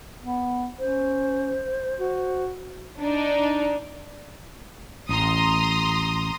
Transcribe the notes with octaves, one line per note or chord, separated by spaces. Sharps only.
B3
C#4 C5
F#4
D4 D#4
A1 A#5 C6 D#6